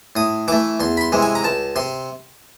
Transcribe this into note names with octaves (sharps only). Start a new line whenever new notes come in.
A2 D#6
E3 A3 D6
E2 C6
B5
C6
C3 E3 G#3
G#5
A#5
C#2 A5
C3 C6